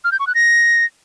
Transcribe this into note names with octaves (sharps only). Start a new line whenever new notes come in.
F6
G6
C#6
F#6
A#6